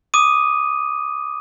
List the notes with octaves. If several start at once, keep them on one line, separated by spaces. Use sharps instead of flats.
D6 D#6 D#7